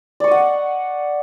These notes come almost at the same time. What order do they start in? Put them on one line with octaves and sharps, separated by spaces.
D5 C#6 D#5 F#5